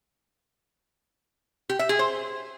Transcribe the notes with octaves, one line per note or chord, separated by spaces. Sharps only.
G4
E5
G#4
C5